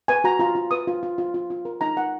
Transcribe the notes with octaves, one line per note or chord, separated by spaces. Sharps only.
B4 G#5
F#4 A#5
F4 A#5
F4
B4 D#6
F4
F4
F4
F4
F4
A#4
D#4 A#5
A#4 F#5